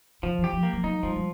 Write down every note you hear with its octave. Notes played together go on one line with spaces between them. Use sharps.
D3 F3
E3
G4
F3
A#3
F3
F#3 D#4
F3 G3
G3